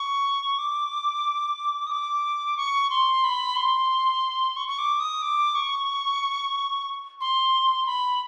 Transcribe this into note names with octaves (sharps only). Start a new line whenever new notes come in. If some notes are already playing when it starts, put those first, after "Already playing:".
Already playing: C#6
D6
D#6
D6
C#6
C6
B5
C6
C#6
C#6
D6
D#6
D6
C#6
C6
B5